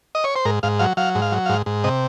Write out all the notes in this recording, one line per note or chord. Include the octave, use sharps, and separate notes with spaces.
D#5
C#5
C5
G#2 A#4
G#2 F5
F#3 F5
F#3 F5
G#2
F5
F#3
G#2 F5
G#2
C3 D#5